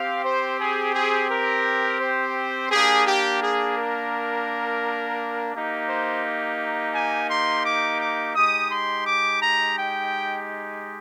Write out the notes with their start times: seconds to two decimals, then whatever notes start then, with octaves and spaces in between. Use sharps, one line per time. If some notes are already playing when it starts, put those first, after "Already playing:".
Already playing: C4 G4 F5
0.25 C5
0.60 G#4
0.95 G#4
1.30 A#4
2.01 C5
2.71 A#3 D4 G4 G#4
3.07 G4
3.42 G#4
3.77 A#4
5.54 A#3 D#4 G4
5.89 C5
6.95 G#5
7.30 C6
7.66 D6
8.01 D6
8.35 G#3 D#4 G4 D#6
8.71 C6
9.06 D6
9.42 A#5
9.77 G5